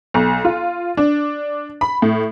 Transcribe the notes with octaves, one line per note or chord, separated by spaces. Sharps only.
B1
F4
D4
B5
A2